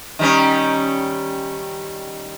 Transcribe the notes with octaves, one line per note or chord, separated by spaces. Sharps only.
D#3 G3 C#4